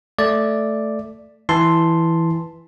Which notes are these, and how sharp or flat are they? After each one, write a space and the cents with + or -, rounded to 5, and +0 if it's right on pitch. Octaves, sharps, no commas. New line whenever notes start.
A3 +0 D5 +0
E3 +0 A5 +0 C6 +0